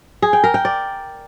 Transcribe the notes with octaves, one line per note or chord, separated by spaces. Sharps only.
G#4
G5
A#4
G5
D5